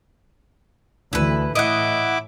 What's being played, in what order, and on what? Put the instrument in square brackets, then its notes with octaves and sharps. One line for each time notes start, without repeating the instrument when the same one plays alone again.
[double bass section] D2 E3 A3 [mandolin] E4 B4
[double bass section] A2 [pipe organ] E4 D6 [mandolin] D#5 F#5